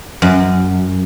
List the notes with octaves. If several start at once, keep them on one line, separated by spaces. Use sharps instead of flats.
F#2